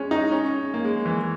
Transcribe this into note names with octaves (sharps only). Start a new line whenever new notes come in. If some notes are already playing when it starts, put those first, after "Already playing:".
Already playing: G#3 C#4
D#4
C#4
A#3
G#3
E3